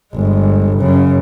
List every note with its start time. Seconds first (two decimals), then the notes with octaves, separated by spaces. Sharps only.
0.15 G1 G#3
0.77 F#2 C#3